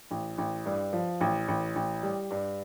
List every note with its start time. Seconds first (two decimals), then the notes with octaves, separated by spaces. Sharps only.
0.11 A1
0.38 A1
0.66 G2
0.93 F3
1.21 A1
1.48 A1
1.76 A1
2.03 G3
2.31 G2